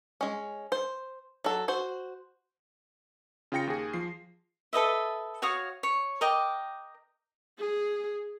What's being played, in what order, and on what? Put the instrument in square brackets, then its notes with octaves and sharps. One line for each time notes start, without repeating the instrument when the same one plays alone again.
[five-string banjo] G#3 C#4
C5
F#3 A4
F#4 C5
[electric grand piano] C#3 F4 G5 A#6 C#7
D#2 G#4
F3 C7
[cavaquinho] A4 B4 D#5 E5
F#4 C#5 F5 D#6
C#5
A#4 D#5 G5 D6
[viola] G#4